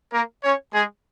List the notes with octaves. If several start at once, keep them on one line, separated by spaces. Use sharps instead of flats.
A#3 A#4
C#4 C#5
G#3 G#4